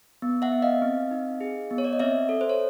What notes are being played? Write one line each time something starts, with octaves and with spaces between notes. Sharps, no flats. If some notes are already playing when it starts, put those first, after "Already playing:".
B3
E5 F#5
B3
D#5 F5
C4
D#4
G#4
B3
C#5
D5
D#5
C4 D5 E5
A4
C5
C#5